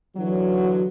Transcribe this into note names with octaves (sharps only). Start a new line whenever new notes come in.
D3 E3 F#3